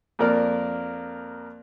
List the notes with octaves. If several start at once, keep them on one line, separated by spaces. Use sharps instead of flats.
F2 A#3 A#4 D5